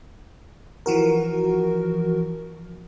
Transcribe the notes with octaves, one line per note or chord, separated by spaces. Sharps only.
E3 F3 F#4 A#4